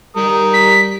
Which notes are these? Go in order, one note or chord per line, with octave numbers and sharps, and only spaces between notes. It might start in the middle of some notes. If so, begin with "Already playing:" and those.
G3 A#4 D#6
B6